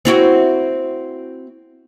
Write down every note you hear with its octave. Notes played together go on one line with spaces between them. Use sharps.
C4 E4 F#4